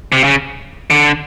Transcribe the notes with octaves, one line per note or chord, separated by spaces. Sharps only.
C3
C#3
D3